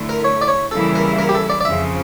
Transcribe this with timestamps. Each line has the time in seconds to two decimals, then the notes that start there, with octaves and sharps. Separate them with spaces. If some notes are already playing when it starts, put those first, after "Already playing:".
Already playing: D3 A3 E4
0.09 A#4
0.24 C#5
0.42 D5
0.48 C#5
0.71 C#3 E3 G3 A#3 E4 A4
0.95 A#4
1.19 A#4
1.29 G4
1.35 A4
1.50 D5
1.61 D5
1.65 F2 C#3 F3 E5